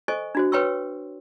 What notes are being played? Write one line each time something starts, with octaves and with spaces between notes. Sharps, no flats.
A4 C5 D#5 G#5 C#6
D4 F#4 C5
B4 C#5 G5 C6 C#6 E6